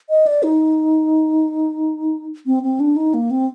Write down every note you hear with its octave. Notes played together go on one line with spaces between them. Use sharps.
D#5
D5
D#4
C4
C4
D4
D#4
A#3
C4